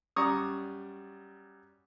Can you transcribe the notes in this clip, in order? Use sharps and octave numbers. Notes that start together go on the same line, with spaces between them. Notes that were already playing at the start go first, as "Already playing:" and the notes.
F#2 G3 D5 A#5 C#6 D#6